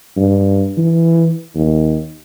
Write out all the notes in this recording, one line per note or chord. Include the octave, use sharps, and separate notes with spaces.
G2
E3
D#2